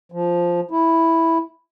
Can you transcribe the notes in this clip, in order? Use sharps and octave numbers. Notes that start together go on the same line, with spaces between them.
F3
E4